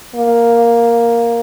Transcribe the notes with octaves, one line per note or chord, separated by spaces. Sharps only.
A#3